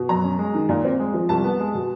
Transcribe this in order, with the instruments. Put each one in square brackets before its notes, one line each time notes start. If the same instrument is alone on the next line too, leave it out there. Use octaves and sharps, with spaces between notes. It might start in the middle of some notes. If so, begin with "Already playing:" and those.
Already playing: [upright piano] B2
F#2 A#5
C#4
G#3
D#3
A#2
C4
G#3
F3
C2 A5
B3
G#3
B2